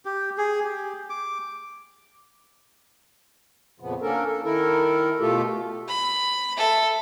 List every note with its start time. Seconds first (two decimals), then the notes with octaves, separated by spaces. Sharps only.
0.05 G4
0.38 G#4
0.64 G4
1.10 D6
3.80 F2 A#2 C#3 F3 B3
4.02 A#3 C#4 D4 A4 A#4
4.25 A4
4.44 D#3 E4 A4 A#4
5.20 B2 A3 F4 G4 A4
5.88 B5
6.57 A4 E5